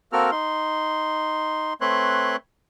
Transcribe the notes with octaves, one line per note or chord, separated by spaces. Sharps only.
A#3 C4 F#4 A4 A#4 F6
D#4 C6
A3 C4 B4 C#5 C6 F#6